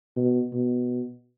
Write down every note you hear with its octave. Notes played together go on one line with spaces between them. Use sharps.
B2
B2